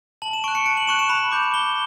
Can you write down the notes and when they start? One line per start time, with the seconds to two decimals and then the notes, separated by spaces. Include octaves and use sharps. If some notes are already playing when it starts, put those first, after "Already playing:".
0.22 A5 F#7
0.33 E7
0.44 C#6 F#6 D7
0.55 C#7
0.66 A5 D7
0.77 F#7
0.87 C#6 F#6 E7
0.99 E7
1.10 B5 F#7
1.32 D6 G6
1.54 B5 G7